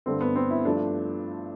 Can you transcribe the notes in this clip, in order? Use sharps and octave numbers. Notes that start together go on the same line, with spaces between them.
G2 D3 A3 C4
B3
C4
E4
G2 F3 A3 D4